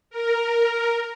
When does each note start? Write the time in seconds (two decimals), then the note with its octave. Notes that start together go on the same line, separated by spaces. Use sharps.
0.10 A#4